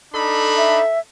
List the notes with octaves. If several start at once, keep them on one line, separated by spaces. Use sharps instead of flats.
D4 D#4 A4 B5
E5